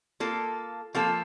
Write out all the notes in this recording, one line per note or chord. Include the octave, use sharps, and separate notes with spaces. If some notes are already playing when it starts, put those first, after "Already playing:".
A#3 F4 A4
F3 A#3 F4 A4